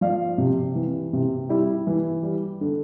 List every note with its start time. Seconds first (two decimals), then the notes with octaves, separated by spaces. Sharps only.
0.01 F3 D5 F5
0.38 C3
0.75 E3
1.13 C3
1.49 G3 E4 G4
1.87 E3
2.23 G3
2.61 D3